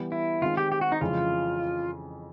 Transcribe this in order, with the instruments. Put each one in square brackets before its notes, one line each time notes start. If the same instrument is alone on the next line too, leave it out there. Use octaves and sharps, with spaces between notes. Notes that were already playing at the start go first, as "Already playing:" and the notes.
Already playing: [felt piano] E3 G3 B3
[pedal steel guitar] E4
[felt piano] D#3 G#3 C4 [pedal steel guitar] F4
[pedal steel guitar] G4
G4
F#4
D#4
[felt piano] F2 C#3 E3 G#3 C#4 [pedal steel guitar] F4